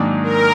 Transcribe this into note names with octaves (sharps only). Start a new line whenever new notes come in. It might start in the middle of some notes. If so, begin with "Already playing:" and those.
Already playing: G#2 D#3 F#3 A#3 D4
A#4